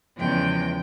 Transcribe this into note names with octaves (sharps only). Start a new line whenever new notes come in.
E2 C#3 F3 G#3 G5